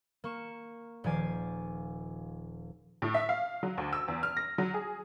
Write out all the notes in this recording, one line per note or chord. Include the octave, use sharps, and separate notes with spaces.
A#3 C#6 E7
D#1 F3 D5 G#5 D6 C7
A2
E5
F5
F#3
D2
E6
E2
F6
A#6
F#3
G#4